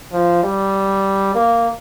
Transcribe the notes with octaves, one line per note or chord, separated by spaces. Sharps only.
F3
G3
A#3